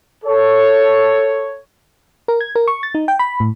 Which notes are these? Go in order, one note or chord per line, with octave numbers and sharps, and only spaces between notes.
A4 C#5
A#4
G#6
A#4
C#6
A6
D#4
G5
B5
A2